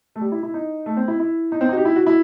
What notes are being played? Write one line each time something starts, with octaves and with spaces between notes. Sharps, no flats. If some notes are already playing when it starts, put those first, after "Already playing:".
A3
G3
E4
E4
D#4
A3
C4
E4
E4
D#4
C4
D#4 F#4
G4
E4
F#4
E4